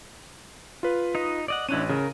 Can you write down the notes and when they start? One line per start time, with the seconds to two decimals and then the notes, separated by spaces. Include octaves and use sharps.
0.83 F4 B4
1.15 D#4 D#5
1.48 D5 D#5 F#5
1.69 A1 C#4 D4 E4 F#6 D#7
1.89 C#3 A#4